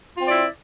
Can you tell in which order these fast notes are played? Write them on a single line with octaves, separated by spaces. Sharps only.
F4 C4 D5 E4